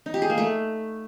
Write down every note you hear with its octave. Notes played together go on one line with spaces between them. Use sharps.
D#4
G4
G#4
A#3
A3